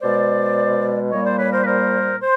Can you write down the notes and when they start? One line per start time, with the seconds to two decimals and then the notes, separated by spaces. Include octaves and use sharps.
0.01 B2 G#3 C5 D5
1.11 A#2 G3 A#3 C#5 D#5
1.25 C5 D5
1.38 B4 C#5
1.52 A#4 C5
1.62 B4
1.66 A#4 C5
2.21 C5